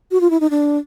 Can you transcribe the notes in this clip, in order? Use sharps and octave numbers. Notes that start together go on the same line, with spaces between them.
F#4
F4
E4
D#4
D4